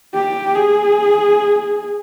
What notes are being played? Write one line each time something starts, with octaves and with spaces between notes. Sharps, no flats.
G4
G#4